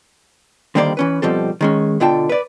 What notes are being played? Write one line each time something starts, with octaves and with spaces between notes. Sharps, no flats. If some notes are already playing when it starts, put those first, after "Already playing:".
D3 D#3 G3 A#3 C5 D5
E3 C#4 B4
B2 F3 G3 C4 A4
D#3 G#3 C#4
B2 D3 F4 G5 A5
B4 D5